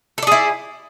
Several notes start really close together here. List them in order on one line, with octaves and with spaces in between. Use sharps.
A4 D5 G#4 E4